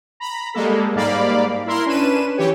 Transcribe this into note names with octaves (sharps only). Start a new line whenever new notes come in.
A#5 B5
G3 G#3 A#3 A4
G#2 G3 A#3 D5 F5 B5
E4 A#4 C6
C#4 D4 B4 D#7 E7
E3 G4 C#5